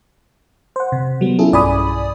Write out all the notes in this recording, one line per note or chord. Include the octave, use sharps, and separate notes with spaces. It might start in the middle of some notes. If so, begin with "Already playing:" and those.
C5 F#5
C3
F#3 G3 B3
C#4 E4 F4 G#4 A4
B1 G2 D5 G#5 B5 D#6